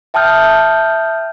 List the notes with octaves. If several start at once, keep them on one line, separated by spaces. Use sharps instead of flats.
E5 G5 A5 D#6 F6 G6